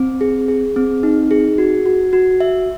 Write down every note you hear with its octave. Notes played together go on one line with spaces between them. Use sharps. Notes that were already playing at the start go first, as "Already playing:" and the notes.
Already playing: C4
G#4
G#4
C4
D#4
G#4
F#4
F#4
F#4
E5